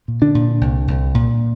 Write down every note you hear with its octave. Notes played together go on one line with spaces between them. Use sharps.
A#2
D3 D4
A#2
C2
C2
A#2